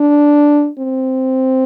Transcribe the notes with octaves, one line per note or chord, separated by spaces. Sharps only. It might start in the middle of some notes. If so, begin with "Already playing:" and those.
Already playing: D4
C4